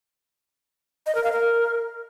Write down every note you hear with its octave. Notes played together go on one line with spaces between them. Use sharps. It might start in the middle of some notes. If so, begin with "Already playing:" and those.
D#5
A#4
F5
A#4